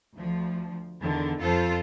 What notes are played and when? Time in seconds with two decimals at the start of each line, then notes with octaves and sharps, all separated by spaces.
0.18 D2 F3
1.00 E2 D3 D#3
1.40 F2 F4 A4 C5